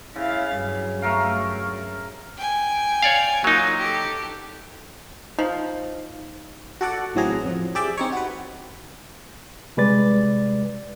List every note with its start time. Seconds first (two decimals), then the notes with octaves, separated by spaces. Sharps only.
0.16 C#3 E4 F5 A6
0.56 G2 F#3
1.02 A3 A#4 F5
2.37 G5 G#5
3.03 C#5 D5 F5
3.44 F#3 A#3 D#4 F4
3.78 G4 A4
5.39 F3 D#4
6.81 F#4 A4 D5 F#5
7.15 A1 E3 F#3 C4 G#4 A#5
7.45 F2 F3
7.75 G4 G#4 D5 E5 G5
7.97 C4 D#4 C#5
8.12 F#4 B4
9.77 C3 G3 G#3 B4 D5 A6